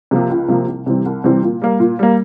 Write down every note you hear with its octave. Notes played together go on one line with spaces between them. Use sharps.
C3 F3 A#3
C#2
C3 F3 A#3
C2
C3 E3 G3 C4
C2
C3 E3 G3 C4
A#2
G3 A#3
A#2
G3 A#3